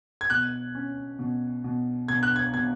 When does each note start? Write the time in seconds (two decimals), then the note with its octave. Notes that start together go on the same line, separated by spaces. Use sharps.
0.21 G#6
0.30 B2 F#6
0.75 C#4
1.19 B2
1.64 B2
2.08 B2 G#6
2.23 F#6
2.36 G#6
2.54 B2 G#6